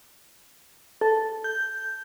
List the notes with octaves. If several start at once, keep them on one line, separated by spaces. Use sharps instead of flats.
A4
G6